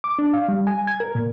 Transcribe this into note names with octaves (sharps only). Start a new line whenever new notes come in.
D6
D4
F5
G3
G#5
G#6
A#4
A#2